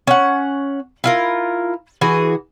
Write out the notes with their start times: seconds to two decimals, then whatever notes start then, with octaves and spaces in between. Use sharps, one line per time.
0.07 C#4 F#5
1.04 E4 F4 A#4
2.01 E3 F#4 G#4